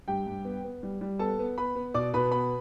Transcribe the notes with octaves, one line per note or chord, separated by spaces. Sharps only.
G2 G4 G5
G2
B3
B3
G3
G3
B3 A4 A5
B3
B3 B4 B5
B3
B2 D5 D6
B2 B4 B5
B3 B4 B5